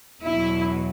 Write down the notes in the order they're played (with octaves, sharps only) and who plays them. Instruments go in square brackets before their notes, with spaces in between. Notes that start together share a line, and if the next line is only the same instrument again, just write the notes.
[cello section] E2 B2 F#3 E4